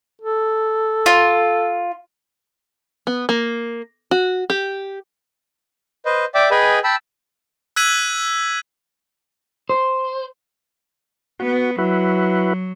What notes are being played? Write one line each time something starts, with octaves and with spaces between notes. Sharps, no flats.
A4
F4
B3
A#3
F#4
G4
B4 C5 D#5
D5 E5 G5 D6
G#4 B4 D#5 G5 G#5 B5
G5 A5 B5 E6
E6 F#6 G#6 B6 D#7 F#7
C5
B3 F#4
F#3 E4 F#4 B4